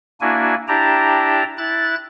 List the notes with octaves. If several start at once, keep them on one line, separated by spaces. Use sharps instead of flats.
A#3 D4 E4 F#4 G#5
D4 E4 G4 G5 A5 A#5
E4 F#6 A6